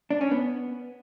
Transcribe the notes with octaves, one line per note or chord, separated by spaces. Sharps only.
D4
C#4
B3